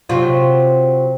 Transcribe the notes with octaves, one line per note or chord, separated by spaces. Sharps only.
C3 F#3 F4